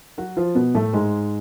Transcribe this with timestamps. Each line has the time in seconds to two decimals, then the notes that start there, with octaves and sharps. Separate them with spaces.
0.18 F#3 F#4
0.37 F3 F4
0.55 B2 B3
0.75 A2 A3
0.93 G#2 G#3